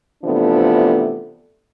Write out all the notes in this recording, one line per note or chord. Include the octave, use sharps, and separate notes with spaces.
C3 E3 F3 A3 B3 D4